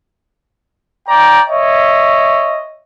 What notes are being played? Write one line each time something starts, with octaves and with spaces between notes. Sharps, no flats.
D5 G5 A#5
C#5 D#5 E5